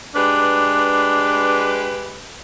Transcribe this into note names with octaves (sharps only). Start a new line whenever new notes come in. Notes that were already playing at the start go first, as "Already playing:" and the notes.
G#3 D4 G4 B4